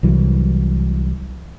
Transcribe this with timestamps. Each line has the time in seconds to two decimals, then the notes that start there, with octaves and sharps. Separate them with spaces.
0.03 C2 E3 F#3